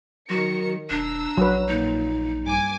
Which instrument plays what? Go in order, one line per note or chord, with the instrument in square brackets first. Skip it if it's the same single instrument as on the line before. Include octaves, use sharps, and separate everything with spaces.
[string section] D#3 A#4 C#7 [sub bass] F#3 [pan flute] F#4
[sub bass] E1 [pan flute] D4 [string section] A#5 E6
[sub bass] A#1 [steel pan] F#3 B4
[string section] A#2 [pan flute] D#4
[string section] G2 G#5 D6